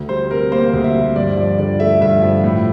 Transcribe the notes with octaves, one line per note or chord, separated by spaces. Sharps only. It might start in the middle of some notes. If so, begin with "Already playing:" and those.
Already playing: D2
G3 C5
C3 A#4
A#3 C5
D2
E5
G3
G2 D5
F3 D5
D3 D5
A3 E5
G2 E5
F3
A2